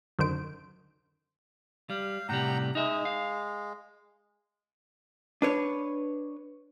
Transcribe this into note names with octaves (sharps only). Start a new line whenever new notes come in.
F#2 D3 D#3 C5 D7
G3 F5
A2 C3 G3 F#5 G5 A#5
G#3 D#4 E5
F5
D4 B4 C#5